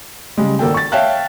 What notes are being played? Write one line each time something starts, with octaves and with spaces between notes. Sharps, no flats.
C#3 G3 G#3
G#1 A#3 A4 G5
C#6 A6
C#5 E5 F5 G5 A5 F#6